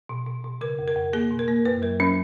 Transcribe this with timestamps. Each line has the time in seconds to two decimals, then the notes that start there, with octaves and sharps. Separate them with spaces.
0.09 B2
0.27 B2
0.44 B2
0.61 C#3 A#4
0.79 F2
0.88 A#4
0.96 F2
1.13 A#3 G#4
1.31 B2
1.39 A#4
1.48 A#3
1.65 F#2 B4
1.82 F#3 A#4
2.00 F#3 C#4